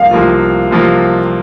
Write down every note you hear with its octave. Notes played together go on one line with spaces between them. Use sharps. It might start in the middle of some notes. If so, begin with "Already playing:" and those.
Already playing: C2 C3 F3 A#3 F4 F5
C2 C3 F3 A#3 F4
C2 C3 F3 A#3 F4